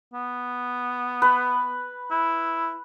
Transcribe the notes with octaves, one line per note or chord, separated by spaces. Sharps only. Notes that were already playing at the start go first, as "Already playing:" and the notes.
B3
B4
E4